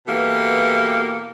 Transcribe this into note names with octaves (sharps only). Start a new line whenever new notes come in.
B2 E3 A#3 G4 A4